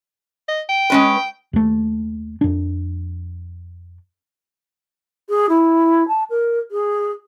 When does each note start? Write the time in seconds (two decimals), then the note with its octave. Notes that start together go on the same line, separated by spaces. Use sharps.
0.48 D#5
0.69 G5
0.90 G#3 C#4 B4
1.53 D#2 A3
2.41 F2 D4
5.29 G#4
5.49 E4
6.08 A5
6.30 A#4
6.71 G#4